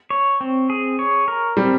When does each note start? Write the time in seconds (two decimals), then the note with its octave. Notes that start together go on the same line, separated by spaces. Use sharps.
0.10 C#5
0.41 C4
0.70 G#4
0.99 C#5
1.28 A#4
1.57 G3 C4